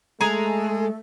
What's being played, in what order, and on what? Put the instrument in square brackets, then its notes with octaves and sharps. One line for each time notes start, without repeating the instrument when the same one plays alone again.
[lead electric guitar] G#3 [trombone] A3 [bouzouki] G#4 G#5 A#5 [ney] A4